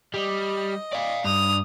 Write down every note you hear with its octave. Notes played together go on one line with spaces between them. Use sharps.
G3 D#5
D5 F5
G2 D#6 F7